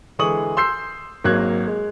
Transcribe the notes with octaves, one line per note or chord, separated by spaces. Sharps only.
D3 E3 G#3 C#6 D#6 F#7
C6 E6 G6 C7
G#1 F#3 G#3 A#3 F#6 G#6
G#3